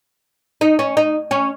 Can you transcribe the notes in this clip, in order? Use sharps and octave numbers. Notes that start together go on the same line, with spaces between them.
D#4
C#4
D#4
C#4